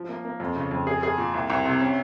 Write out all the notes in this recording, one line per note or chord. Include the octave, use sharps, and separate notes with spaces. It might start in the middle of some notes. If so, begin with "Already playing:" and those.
Already playing: F3
A#3
A#3
F2
C#3
F2
G#4
G#4
A#2
C2
C2
C3
C#4